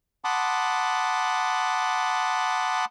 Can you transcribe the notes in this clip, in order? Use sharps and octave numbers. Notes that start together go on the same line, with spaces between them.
F#5 A5 B5 C6 D6 D#6